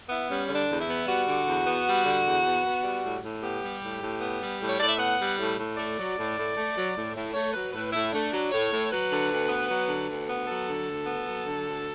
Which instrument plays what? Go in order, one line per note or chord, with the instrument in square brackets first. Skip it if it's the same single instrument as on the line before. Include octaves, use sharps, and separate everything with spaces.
[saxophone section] B3 E4
G3 C#4
D3
D4
E2
E4
B3
G3 F#4
D3
E2
B3
G3
D3
E2
B3
B3
G3
A2
A2
B3 G4
G3
A2
A2
B3
G3
A2
C#5
A2 D5
E5
B3 F#5
G3
A2
A2
A3 D5
F#3
A2
A2
A3
F#3
A2
A2
A3 C#5
F#3 B4
A2 B4
A2 E4
A3 D4
F#3
A2 C#5
A2
F#3 B4
D3
D2
B3
F#3
D3
D2
B3
F#3 A4
D3
D2
B3
F#3
D3
D2